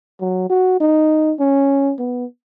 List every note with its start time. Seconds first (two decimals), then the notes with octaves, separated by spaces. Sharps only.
0.21 F#3
0.49 F#4
0.80 D#4
1.39 C#4
1.99 B3